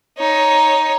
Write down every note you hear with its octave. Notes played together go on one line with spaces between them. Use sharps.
D#4 C#5